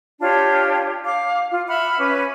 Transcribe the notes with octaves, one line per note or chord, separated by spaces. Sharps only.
D4 F4 G4 C#5
F5 D6
F4
E5 F#5 B5 F6
C#4 B4 D6